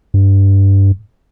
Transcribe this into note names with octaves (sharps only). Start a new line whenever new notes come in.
G2